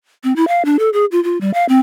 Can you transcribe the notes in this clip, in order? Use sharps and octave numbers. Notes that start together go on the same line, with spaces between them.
C4
E4
F5
D4
A4
G#4
F4
F4
G3
F5
C4